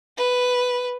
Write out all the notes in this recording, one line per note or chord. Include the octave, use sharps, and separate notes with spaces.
B4